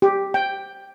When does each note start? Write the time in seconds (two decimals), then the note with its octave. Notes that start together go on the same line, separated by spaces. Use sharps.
0.02 G4
0.34 G5